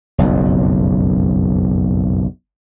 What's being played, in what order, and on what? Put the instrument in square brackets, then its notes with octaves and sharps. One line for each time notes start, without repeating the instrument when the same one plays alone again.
[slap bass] F#1 B1 F2